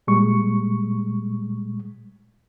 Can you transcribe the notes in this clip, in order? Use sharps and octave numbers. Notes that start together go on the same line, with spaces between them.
A#2 G3 G#3 C#6